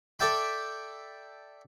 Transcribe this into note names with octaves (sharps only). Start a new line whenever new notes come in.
A4 D5 E5 G5 A5 B5